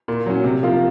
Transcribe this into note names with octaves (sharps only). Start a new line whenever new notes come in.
A#2
F#3 C#4
C3
F3 A#3 F4 A#4